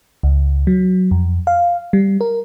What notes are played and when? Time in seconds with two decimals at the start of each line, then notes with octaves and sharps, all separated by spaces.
0.23 C#2
0.67 F#3
1.11 F2
1.47 F5
1.93 G3
2.21 A#4